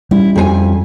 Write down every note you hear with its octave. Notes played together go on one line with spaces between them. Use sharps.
G3 C#4 E4
F2 G#4 G#5